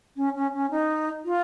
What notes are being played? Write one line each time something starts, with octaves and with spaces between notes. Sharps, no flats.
C#4
C#4
C#4
D#4
F4